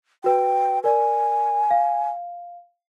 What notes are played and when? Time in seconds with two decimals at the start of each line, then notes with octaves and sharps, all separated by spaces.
0.24 F#4 B4 G5
0.84 A#4 D5 G#5
1.71 F5